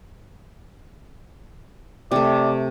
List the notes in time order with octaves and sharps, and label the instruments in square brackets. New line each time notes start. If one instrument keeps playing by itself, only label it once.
[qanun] C3 A3 [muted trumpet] D5